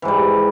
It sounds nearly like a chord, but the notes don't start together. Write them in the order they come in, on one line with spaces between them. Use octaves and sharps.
E3 G#2 G3